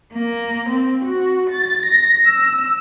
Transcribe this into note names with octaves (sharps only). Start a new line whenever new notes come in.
A#3
C4
F#4
A6
A#6
E6